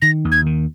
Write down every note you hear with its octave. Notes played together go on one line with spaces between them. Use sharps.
D#3 A#6
D#2
G#6
D#3